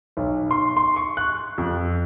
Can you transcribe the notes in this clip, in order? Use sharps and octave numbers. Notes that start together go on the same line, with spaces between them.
B1
C6
C6
C#6
F#6
F2